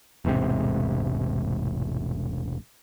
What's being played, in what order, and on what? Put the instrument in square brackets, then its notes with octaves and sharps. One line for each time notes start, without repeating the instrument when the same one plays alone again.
[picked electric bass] E1 A1 G#2 C3